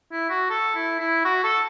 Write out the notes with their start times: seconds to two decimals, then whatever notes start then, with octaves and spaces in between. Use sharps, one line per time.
0.12 E4
0.30 F#4
0.50 A4
0.75 E4
1.00 E4
1.25 F#4
1.44 A4